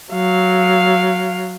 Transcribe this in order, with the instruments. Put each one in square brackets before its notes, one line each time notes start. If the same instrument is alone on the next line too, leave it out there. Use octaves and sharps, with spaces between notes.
[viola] F#3 F5